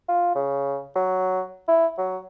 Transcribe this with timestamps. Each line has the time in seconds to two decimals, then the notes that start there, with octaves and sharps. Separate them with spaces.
0.09 F4
0.35 C#3
0.96 F#3
1.68 E4
1.98 F#3